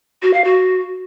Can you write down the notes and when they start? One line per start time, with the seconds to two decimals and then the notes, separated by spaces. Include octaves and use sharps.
0.22 F#4
0.33 F5
0.44 F#4